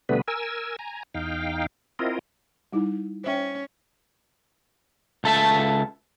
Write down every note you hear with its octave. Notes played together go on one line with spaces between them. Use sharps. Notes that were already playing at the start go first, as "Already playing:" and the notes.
B2 D3 G3 A3 B3 B4
A#4 G#5 E6
G#5 A#5
E2 D#4 F5 G5
C4 E4 F4 A#4 D#5
G3 D#4 E4
C#4 C5 E5 G5
C#2 A4 E5 A5